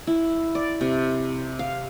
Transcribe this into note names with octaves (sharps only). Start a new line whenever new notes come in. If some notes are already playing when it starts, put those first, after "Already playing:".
E4
D5
C3
F5